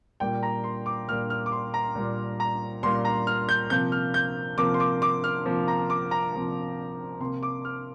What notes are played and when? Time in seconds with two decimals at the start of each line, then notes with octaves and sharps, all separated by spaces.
0.20 A#2 G3 A#3 G5
0.43 A#5
0.64 C6
0.86 D6
1.08 A#2 G3 A#3 F6
1.30 F6
1.46 D6
1.52 C6
1.74 A#5
1.95 A#2 G3 A#3
2.40 A#5
2.83 A#2 G3 A#3 C6
3.05 A#5
3.27 F6
3.49 G6
3.70 C3 F3 A#3 G6
3.92 F6
4.14 G6
4.58 C3 F3 A#3 D6
4.74 C6
4.80 D6
5.02 D6
5.24 F6
5.45 C3 F3 A#3
5.68 A#5
5.90 D6
6.11 A#5
6.33 C3 F3 A#3
7.20 C3 A#3 C6
7.43 D6
7.65 F6